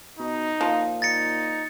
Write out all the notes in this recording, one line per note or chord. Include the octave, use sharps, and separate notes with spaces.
B2 D#4
A#2 F3
D#4 A6 A#6 C#7